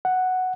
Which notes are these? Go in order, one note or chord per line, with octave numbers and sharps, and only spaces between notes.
F#5